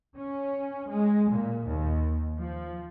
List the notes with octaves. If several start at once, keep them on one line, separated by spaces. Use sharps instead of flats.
C#4
G#3
A#2
D#2
F3